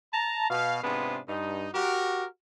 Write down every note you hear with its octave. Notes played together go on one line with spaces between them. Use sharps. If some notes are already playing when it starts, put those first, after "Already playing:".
A5 A#5
B2 F5
G#2 C3 B3 D4 F4 G#4
G2 D#4
F#4 G4 A#4